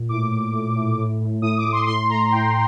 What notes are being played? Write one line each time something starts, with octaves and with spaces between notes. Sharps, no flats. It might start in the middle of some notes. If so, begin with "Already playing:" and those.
Already playing: A#2
A2 D6
A2
A2
A2
A2
A2
A2 D#6
D6
A2
C6
A2 C6
A2 A#5
A2 G5